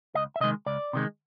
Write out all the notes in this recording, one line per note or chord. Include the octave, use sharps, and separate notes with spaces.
C#2 D#5
E5
C3 D#3 G#3 D#5
C#2 D5
C3 D#3 G#3